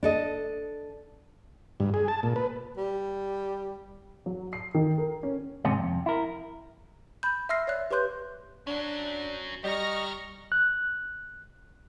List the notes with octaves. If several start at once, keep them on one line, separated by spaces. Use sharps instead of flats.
D4 A4 D#5
G2
G#4
A5
A#2
B4
G3
F#3
C7
D#3
A#4
C#4
D#2 G#2 C3 C#4
F2
E4 A#4
B5 G6
E5 C6 E6 F6 A#6 C7
C#5 D5 E5 F#6
G4 B4 C#5 C6 F#6 G6
F#3 C#4 D4
G3 G4 D#5 A#5 C#6 F6 A#6
F#6